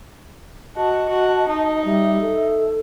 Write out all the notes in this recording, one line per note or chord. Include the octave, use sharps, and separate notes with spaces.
F#4 D#5 A5
F#4
D#4
G3 E5
A4